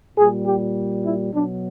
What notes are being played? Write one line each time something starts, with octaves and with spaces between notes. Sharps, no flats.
A#2 G3 G#4
G4
E4
B2 F#3 D4